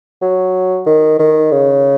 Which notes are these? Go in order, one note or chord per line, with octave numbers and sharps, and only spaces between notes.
F#3
D#3
D#3
C#3